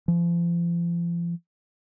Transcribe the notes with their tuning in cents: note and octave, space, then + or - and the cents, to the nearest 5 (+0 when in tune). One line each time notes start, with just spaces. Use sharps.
F3 -35